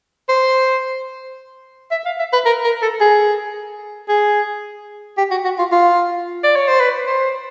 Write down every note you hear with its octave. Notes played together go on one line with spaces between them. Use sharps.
C5
E5
F5
E5
B4
A#4
A#4
A4
G#4
G#4
G4
F#4
F#4
F4
F4
D5
C#5
C5
B4
C5